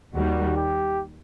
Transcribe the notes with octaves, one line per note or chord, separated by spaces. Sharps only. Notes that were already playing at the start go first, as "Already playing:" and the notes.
D#2 D#3 G3 F#4
G4